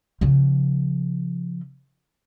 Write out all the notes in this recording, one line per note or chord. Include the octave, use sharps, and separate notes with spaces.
C#3 F3